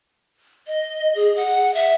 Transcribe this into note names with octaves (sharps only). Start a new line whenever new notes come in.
D#5
G#4
F#5
E5